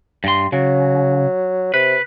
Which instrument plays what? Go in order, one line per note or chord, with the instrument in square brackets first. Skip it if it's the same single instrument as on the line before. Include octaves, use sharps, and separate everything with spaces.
[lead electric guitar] G2 C6
[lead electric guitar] C#3 [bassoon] F#3
[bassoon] C3 [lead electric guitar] B4